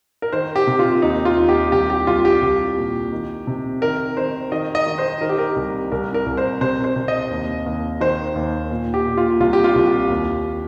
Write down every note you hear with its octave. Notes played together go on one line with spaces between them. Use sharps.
A#4
D#3 C5
G4
C3
F4
D#2 D#4
F4
D#2
G4
C2 G4
G4
C2 F4
G4
C2
A#2
D#3
C3
D#3 A#4
D#3 C5
D#3 D#5
D#5
D#3
C5
D#3 A#4
G4
A#4
C2
C2 A#4
A#4
C2
C5
C3 C5
C5
C3
D#5
D#2
D#2
D#3 C5
D#2
A#2
G4
A#2
F4
C2 F4
G4
F4
C2
G4
D#2